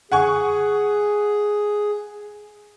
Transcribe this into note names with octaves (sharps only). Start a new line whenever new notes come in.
G#4 F#5 G#5 C#6